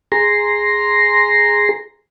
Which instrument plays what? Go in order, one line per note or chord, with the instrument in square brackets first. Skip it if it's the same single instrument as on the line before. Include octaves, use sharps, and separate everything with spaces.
[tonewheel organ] G#4 A#5 C6